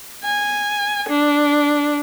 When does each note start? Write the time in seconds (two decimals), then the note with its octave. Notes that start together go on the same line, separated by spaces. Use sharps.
0.24 G#5
1.09 D4